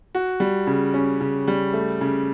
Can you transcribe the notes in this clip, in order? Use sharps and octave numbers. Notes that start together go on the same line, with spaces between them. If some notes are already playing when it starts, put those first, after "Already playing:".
F#4
G3
C#3
C#4
C#3
G3
A3
C#3